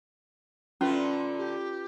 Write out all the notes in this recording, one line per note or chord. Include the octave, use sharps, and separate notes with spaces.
A#2 D3 A3 C#4 F4 B4
G4